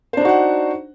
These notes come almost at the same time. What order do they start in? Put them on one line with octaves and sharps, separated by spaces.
C5 D4 D#4 F#4 F#5